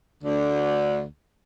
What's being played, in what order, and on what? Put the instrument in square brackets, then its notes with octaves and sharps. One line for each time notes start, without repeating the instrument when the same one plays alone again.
[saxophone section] D2 D3